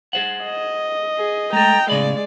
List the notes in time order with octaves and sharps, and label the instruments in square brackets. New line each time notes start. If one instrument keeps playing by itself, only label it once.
[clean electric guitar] G#4 C5 F#5
[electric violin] D#5
[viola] G#4
[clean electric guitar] G#3 A3 A4 [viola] G5 A#5
[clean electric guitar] A2 C#3 B5 [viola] G#3 D5